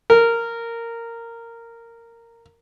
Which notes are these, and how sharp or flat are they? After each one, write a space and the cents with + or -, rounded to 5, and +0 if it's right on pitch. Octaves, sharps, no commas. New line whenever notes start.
A#4 -10